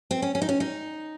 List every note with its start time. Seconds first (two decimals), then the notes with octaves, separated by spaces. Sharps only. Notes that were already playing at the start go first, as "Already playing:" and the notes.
0.11 C4
0.22 C#4
0.35 C#4
0.42 D#4
0.49 C#4
0.60 D#4